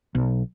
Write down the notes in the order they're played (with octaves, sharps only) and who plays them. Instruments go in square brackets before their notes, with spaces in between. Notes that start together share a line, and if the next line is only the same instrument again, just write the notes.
[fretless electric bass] B1